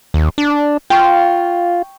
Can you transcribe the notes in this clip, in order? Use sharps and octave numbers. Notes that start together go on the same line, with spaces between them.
D#2
D4
F4 G5 C#6